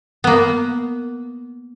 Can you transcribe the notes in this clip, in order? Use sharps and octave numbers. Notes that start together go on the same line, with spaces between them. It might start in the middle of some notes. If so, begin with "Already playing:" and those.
A#3 B3